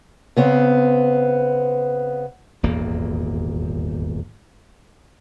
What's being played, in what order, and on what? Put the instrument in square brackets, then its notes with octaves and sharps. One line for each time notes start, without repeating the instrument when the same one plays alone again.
[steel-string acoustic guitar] C#3 B3 C4
[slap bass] D#1 G#1 E2 A#3